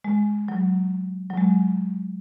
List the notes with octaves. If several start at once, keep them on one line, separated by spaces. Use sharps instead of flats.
G#3
F#3
F#3
G#3